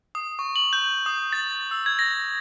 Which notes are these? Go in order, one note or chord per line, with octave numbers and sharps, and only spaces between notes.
D#6
C#6
F#7
G6
D#6
A6
E6
G#6
A#6